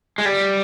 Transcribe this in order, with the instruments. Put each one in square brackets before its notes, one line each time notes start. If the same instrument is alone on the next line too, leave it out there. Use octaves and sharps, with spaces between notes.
[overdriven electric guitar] G#3
G3